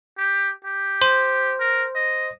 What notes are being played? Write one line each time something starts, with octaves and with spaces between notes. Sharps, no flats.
G4
G4
C5
A#4
D#5